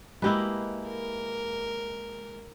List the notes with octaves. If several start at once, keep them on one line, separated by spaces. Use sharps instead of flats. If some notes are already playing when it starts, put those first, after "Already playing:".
G#3 A#3 E4 G4 B4 D#5
A#4